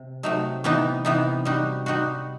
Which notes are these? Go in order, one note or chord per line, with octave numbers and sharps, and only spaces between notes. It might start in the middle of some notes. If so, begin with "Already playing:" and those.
Already playing: C3
C3 F#3 A3 D#4
C3 E3 B3 D#4
C3 E3 B3 D#4
G3 D#4 F#4
G3 D#4 F#4